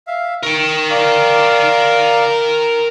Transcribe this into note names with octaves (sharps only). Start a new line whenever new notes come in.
E5 F5
A#4 G5 C#6
D5 F5 A#5